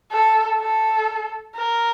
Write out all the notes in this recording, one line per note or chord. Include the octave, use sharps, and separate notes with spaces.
A4
A4
A#4